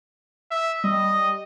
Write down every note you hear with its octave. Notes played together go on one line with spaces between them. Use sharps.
E5
G3 D#5